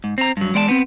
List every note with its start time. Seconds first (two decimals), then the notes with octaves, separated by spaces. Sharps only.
0.04 G#2
0.18 C4 A#5
0.37 G2 F#3
0.54 E2 G#3 D5 F#5 A5
0.69 B3 C4